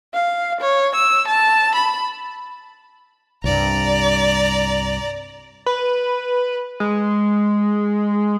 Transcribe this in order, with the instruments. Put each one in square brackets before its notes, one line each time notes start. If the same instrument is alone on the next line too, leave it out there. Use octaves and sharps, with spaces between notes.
[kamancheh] F5
C#5
E6
A5
B5
[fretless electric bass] C2 G2 [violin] D5 A#5
[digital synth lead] B4
G#3